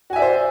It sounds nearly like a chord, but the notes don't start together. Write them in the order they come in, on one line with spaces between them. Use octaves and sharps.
F#4 G#5 E5 D5 C5